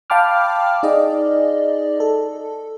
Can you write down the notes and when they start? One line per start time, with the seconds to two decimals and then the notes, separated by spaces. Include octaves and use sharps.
0.10 F5 G5 A5 B5 D6 F6
0.83 D#4 G#4 D5 D#5
2.00 A4